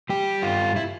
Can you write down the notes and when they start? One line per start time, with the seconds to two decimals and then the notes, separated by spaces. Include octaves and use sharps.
0.09 G3 G4
0.42 G2 F4
0.76 E4